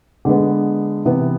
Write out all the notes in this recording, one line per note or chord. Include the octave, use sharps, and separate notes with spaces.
D3 G#3 B3
C3 E3 B3